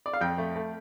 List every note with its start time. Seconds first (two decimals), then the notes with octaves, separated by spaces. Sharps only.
0.06 D5
0.13 F5
0.21 F2 G5
0.38 A3
0.56 A3